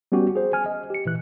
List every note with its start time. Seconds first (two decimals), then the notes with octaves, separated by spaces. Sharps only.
0.12 G3 B3 C#4 F#4 G4
0.36 G#4 C5
0.53 G#5 F6
0.66 D#5
0.90 G4 C#7
1.05 A#2 E3 F#6